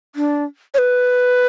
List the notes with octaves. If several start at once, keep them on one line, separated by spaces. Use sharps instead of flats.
D4
C#5
B4